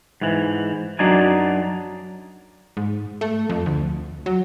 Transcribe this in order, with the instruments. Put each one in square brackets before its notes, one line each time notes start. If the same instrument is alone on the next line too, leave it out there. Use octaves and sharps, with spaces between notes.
[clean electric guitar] G#2 E3
F#2 F#3 D4 D#4 D5 G#5
[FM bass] G#2
A3
F2
D2
F#3